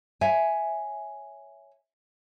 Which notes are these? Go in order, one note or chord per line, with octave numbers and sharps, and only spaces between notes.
C#5 E5 G#5